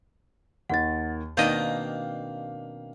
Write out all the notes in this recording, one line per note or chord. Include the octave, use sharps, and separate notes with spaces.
D#2 D#3 F#5 A6
B2 D#3 A#3 C4 D4 D#5 F5 G6